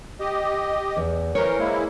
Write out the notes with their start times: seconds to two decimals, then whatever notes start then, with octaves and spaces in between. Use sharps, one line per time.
0.20 G4 D#5
0.96 E2
1.35 E3 A#4 C5 C#5
1.59 G#3 A#3 E4